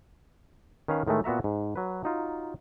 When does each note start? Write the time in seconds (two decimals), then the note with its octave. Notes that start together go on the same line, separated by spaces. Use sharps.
0.88 D#3 C#4 B4 F5
1.07 A2 D#3 G#3 A3
1.24 A#2 B3 F#4 E5 A#5
1.44 G#2
1.76 F#3 B4
2.04 F#3 D#4 F4